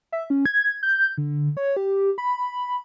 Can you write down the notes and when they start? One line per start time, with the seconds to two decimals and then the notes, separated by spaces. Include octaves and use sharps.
0.12 E5
0.30 C#4
0.46 G#6
0.83 G6
1.18 D3
1.57 C#5
1.77 G4
2.18 B5